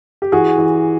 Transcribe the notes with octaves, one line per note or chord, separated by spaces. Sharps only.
G4
E3 F#4 G#4
E3